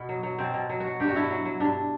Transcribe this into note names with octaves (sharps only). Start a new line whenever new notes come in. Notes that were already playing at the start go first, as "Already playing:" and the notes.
Already playing: B2 B3
F#3
F#3
B2 C4
B2
F#3
F#3 F#4
G2 G4
F#4
G2 E4
F#4
F#3
F#3
G2 D4